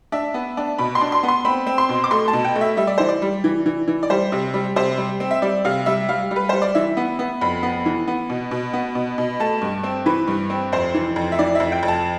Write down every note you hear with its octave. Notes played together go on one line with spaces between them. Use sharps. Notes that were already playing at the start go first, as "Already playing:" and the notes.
D4 E5
B3
D4
B2 B5
C6
D4
C6
B3
C6
C4 B5
C4
C6
B2
D6
A3 C6
A5
B2
G5
A3
E5
G3 E5
D5
E3 C5
D5
G3
E3
E3
E3
D5
G3 C5
C3
G3
C3 C5
G3
C4
E5
G3 D5
C3 F5
G3 E5
G3 F5
G3
B4
G3 C5
D5
E3 E5
B3
B3
F2 B5
B3
E3
B3
B2
B2
B3
B2
B2
A3 A5
G2
C4
E3 B4
G2
C4
F2 C5
E3
F2
E5
E3 D5
F2 E5
G5
F2
A5